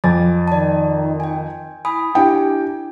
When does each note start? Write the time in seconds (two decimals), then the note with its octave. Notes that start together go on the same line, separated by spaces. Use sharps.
0.04 F2 G#5 D6 A6
0.48 D#3 D5 A5
1.20 G5 G#5
1.85 E4 G#5 B5 D#6
2.15 D4 E4 G4 G5 G#5